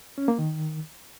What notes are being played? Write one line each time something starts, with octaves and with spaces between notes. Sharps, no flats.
C#4
A#3
D#3